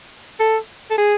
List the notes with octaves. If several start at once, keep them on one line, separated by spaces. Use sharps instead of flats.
A4
A4
G#4